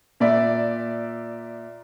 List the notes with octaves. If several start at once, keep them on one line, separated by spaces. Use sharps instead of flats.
A#2 D5 E5